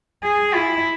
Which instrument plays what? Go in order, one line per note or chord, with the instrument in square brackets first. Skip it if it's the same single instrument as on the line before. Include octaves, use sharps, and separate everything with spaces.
[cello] G#4
E4